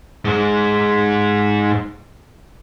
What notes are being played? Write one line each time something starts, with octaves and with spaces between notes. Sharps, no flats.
G#2 G#3